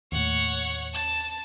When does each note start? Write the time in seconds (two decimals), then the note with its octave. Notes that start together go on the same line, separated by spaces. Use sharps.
0.12 D#2 A2 C#5 F#5
0.93 A5 A6